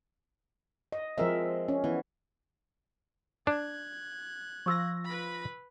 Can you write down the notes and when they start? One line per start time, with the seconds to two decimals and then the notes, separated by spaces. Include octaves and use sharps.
0.92 D#5
1.18 F3 G#3 C4 A#4 E5
1.68 C#4
1.84 E3 B3
3.47 D4 F#6 G#6
4.66 F3 F4 C#6 E6 A#6
5.05 B4 B5